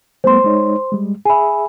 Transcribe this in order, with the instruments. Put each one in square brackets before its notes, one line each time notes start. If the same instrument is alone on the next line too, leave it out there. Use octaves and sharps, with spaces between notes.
[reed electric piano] G3 A3 B3 [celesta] C5 C6
[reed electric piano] G#3 D#4 C#5
G3 G#3
[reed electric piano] G#4 E5 [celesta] G#5 B5